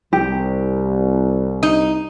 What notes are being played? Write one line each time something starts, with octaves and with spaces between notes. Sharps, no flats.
C2 G4
D#4